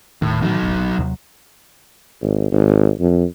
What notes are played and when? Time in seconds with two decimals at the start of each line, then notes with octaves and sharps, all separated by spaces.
0.22 D#1 A2 D#3
0.42 A2 D#3 E3 F#3 D#4
0.62 E1 A1
0.78 A#1
0.99 D#2 C3 F#3
2.22 G#1
2.52 G#1
3.00 F2